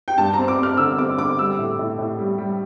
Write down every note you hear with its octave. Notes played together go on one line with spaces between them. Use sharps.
G5
G2 A5
C4 A#5
D6
C4 F6
D3 E6
C4 D6
D3 D6
G3 E6
A2
A2
A2
G3
G3